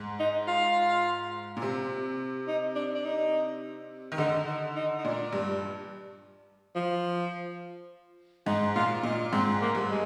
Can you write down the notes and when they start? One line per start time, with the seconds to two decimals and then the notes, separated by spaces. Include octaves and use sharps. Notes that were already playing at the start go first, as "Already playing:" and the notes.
Already playing: G#2
0.20 D#4
0.48 F4
1.57 A#2
1.62 C3
2.48 D#4
2.75 D4
2.94 D4
3.05 D#4
4.12 D#3
4.18 D3 D#4
4.47 D#4
4.76 D#4
4.98 D#4
5.05 A#2 D4
5.33 G2
6.75 F3
8.46 G#2 D#4
8.76 A#2 F4
9.03 A#2 D#4
9.32 G#2 C4
9.62 A#3
9.75 G2
9.90 G#3